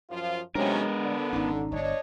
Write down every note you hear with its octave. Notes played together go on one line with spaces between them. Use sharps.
F#2 F3 F4
C3 F#3 G#3 B3 C#4 D4 A#4
D3
G#1 B2 C#4 D#4
G1 G2 D4 C#5 D#5